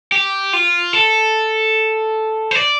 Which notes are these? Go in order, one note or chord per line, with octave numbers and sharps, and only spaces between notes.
G4
F4
A4
C5
D5